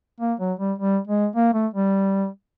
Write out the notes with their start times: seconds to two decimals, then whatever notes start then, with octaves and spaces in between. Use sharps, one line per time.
0.20 A#3
0.40 F#3
0.59 G3
0.78 G3
1.07 G#3
1.35 A#3
1.54 A3
1.74 G3